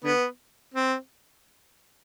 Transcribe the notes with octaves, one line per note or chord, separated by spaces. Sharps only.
D3 B3
C4